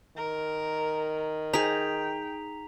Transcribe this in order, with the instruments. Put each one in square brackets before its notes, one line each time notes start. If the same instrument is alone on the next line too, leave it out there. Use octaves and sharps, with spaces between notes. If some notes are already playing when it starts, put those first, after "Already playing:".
[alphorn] D#3 [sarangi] A#4
[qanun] D#4 G#4 [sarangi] G5 [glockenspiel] A#5 B6 F7